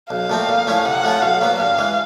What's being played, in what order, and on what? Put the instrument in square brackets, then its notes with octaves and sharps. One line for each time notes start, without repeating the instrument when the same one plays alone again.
[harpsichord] B1 [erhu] F5
[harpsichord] A#2 F3 A3 C4
A#2
F3 A3 C#4 E4
[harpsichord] C3 [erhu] F#5
[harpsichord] F3 A3 C#4 F4
[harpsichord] B1 [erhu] F5
[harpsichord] A#2 F#3 B3
[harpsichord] G2 [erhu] F5
[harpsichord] E3 G#3